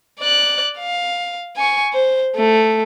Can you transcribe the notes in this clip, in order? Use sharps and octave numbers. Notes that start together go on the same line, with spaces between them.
D5 F#6
F5
G#5 C#6
C5
A3